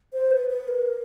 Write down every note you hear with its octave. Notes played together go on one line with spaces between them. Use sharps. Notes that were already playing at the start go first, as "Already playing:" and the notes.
C5
B4
B4
A#4